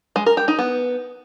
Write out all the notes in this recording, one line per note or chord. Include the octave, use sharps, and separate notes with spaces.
G#3
A#4
G4
D#4
B3